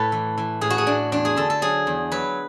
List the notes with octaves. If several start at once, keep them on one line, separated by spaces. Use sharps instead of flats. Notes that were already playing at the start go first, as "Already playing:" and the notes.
Already playing: A2 A4 B4
E3
E3
A2 G#4
F#4
G#4
A2 D4
E2 D4
G#4
D3 A4
A4
F#3 G#4
E2
F#3 B4